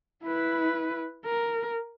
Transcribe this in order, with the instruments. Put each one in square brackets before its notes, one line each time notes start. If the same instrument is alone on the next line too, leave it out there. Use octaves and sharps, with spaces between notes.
[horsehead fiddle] E4 B4
A#4